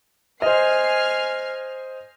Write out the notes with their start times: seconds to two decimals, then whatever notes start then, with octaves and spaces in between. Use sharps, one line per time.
0.42 C5 D#5 G#5 F6 C7